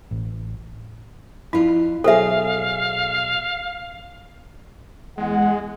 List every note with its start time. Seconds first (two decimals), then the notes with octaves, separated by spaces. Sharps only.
0.11 A1
1.53 F2 E4 F4
2.04 B2 F#3 G#4 A4 C5 E5 F5
5.18 E2 G#3 G#4 F#5